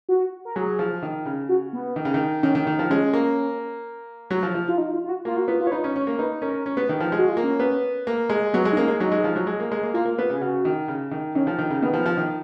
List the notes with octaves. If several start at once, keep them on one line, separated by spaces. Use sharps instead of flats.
F#4
A#4
F#3 G#4
F3
D#3
C#3
F#4
B3
D#3
C#3
D#3
D#3 C#4
D#3
D#3
F3
G#3 C#4
A#3
F#3
F3
F3
F4
D#4
F4
F4
F#4
A#3 F4
F#4
B3 F4
F4
C#5
D#4 B4
C#4
C#4 C#5
A#3
D#4 B4
C#4 A#4
C#4
B3
D#3
F3
G#3
F#4
F4
A#3
C#4
B3
A#3
G#3
F#3 B3
G#3
D#4
A#3 C#4
G#3
F#3 D#4
G#3
F3
F#3
G#3
A#3
G#3
A#3
A#3 F4
A#3
B3
C#3
G#4
C#3 F#4
D#3
C#3
D#3
D#3 C#4
F3
D#3
C#3
D#3 B3
F3
F3
D#3